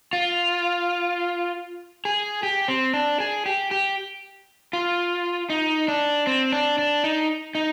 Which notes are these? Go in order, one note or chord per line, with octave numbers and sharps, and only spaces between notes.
F4
G#4
G4
C4
D4
G#4
G4
G4
F4
D#4
D4
C4
D4
D4
D#4
D#4